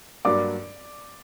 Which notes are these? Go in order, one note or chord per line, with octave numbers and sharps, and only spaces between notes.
G2 F#3 A#3 D4 D5 D6